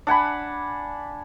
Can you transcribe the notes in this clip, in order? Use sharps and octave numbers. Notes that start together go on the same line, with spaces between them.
D4 F#5 G#5 B5